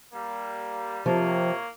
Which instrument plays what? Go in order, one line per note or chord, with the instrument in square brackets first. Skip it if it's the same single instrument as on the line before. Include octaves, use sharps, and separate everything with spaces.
[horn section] G3 A#3
[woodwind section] C3 [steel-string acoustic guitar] F3 [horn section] A#3 C#5